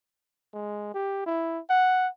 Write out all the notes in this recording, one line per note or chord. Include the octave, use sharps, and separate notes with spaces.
G#3
G4
E4
F#5